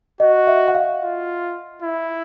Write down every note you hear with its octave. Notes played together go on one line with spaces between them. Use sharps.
F#4 D#5
E5
F#5
F5
F4
E4